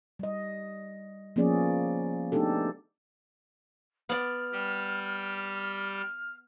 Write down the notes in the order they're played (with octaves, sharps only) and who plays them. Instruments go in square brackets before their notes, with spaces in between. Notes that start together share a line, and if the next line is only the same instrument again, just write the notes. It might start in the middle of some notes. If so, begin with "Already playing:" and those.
[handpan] G3 D#5
F3 A#3 B3 C#4 G#4 D5
A3 B3 D4 D#4 G4 A4
[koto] B3 D5 [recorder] F6
[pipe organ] G3 G4